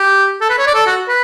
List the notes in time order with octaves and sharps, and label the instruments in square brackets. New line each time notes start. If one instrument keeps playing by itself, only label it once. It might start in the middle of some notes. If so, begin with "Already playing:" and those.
Already playing: [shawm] G4
A4
B4
C#5
D5
A4
F#4
B4